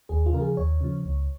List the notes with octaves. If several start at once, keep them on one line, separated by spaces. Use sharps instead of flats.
D#2 G#4
F4
C#3 F3 G#4 A#4
D#2 C#5
C#3 F3
C#2